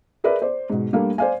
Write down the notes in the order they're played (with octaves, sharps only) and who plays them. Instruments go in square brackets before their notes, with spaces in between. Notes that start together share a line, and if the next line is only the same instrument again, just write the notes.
[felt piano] G#4 A#4 B4 D5 E5
C5 D5
G#2 B2
G3 A3 A#3 D4 A4 F5
C5 D5 F5 G#5